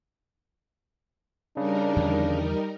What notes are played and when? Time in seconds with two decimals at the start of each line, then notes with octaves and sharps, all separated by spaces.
1.57 C#3 G3 D4 D#4 A#4
1.96 E2 D3 F3